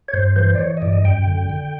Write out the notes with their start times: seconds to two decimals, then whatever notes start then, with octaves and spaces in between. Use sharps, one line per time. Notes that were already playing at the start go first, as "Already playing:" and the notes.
0.08 C#5
0.13 G2 C5
0.36 E3 C5
0.55 D5
0.59 E3 C#5
0.77 D#5
0.82 G2 D5
0.93 D#5
1.04 F#2 G5
1.27 D3
1.49 D3